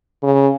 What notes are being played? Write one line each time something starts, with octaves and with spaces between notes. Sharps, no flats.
C#3